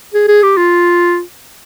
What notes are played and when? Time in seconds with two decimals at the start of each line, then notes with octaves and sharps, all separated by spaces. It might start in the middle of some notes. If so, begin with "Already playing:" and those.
0.14 G#4
0.28 G#4
0.43 G4
0.57 F4